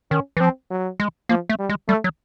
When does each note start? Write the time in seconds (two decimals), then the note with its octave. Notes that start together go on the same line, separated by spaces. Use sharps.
0.11 D#3 C#4
0.37 E3
0.40 F3 C4
0.71 F#3
1.00 G#3
1.29 F3 A#3
1.49 A3
1.59 G3
1.69 G#3
1.89 G3 A3
2.04 F#3